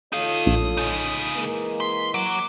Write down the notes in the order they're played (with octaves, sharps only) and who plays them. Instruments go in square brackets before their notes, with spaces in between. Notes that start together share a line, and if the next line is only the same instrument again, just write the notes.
[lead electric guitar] D#4 F5 [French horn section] F4 A4 C#5 [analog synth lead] D#6
[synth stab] A#1
[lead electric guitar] C#3 D#4
[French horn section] E3 G#3 A#3
[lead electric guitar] C6 [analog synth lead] B6
[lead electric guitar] F#3 [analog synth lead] D6